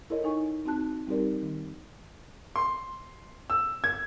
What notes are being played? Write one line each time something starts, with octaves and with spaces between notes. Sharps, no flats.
E4 A4 A#4 C#5 D#5
D#4 G#5 C#6
C4 D#4 F#4 A5 F#6
G3 C4 D#4 G4 A#4 D5
D#3
C6
E6
G#6